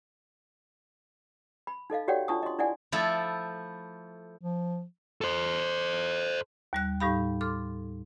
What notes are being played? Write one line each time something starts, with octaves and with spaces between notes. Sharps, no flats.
B5
D#4 A4 D#5 F5
F#4 G4 C#5 D5 F#5 G5
D4 F4 A5 C#6 D#6
D#5 C6
D4 E4 D5 F#5 G#5
F3 A3 E4 A4
F3
A4 C5
D#2 G3 F#6
A2 G3 D#4 G4 F5 B5
A4 C6 D6 F6